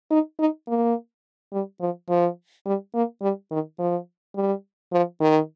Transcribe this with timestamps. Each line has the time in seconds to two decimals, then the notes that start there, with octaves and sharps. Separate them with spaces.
0.11 D#4
0.39 D#4
0.68 A#3
1.53 G3
1.81 F3
2.09 F3
2.66 G3
2.95 A#3
3.22 G3
3.51 D#3
3.79 F3
4.36 G3
4.93 F3
5.21 D#3